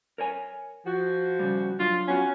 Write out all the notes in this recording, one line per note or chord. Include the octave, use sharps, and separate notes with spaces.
A#4 C#5 G#5
F3 F#4
C#3 G3
F#3 D4 F4
B3 C#4 F4 F#4